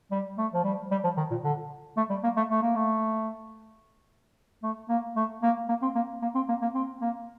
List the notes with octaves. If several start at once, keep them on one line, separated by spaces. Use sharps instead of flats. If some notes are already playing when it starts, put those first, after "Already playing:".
G3
A3
F3
G3
G3
F3
D#3
A#2
D3
A3
G3
A#3
A3
A3
A#3
A3
A3
A#3
A3
A#3
A#3
C4
A#3
A#3
C4
A#3
A#3
C4
A#3